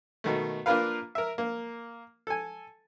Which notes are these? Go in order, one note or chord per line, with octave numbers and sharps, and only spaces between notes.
B2 D#3 A3
A#3 D4 F4 A#4 B4 F5
A#4 E5
A#3
A4 G#5